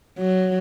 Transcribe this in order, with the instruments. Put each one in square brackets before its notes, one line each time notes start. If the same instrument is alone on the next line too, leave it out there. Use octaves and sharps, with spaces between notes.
[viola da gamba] F#3